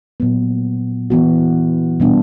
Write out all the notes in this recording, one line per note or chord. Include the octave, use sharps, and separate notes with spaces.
A#2 F#3 B3
E3 B3 F#4
B2 G3 B3 D4